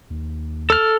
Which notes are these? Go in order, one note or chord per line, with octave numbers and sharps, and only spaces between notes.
D#2
A4 F6